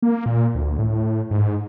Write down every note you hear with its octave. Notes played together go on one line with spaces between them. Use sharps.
A#3
A#2
D2
A2
G#2